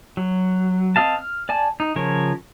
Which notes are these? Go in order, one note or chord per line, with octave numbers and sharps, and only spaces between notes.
F#3
C4 D#5 F5 A5
F6
D5 G#5 A5
D#4
C#3 F3 A#4 C#5